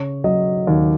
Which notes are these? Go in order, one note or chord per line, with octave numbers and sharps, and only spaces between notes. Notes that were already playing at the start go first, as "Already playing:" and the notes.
Already playing: C#3 C#5
F#3 D#5
D#2